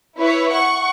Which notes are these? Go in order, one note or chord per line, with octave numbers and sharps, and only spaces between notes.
E4 B4 C#5
F#5 C#6